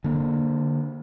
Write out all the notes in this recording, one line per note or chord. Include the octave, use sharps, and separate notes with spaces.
D3 A#3